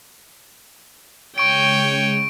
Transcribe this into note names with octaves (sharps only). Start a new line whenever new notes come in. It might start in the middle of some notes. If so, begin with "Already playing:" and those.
C#3 G#3 C#5 G5 C#6 D7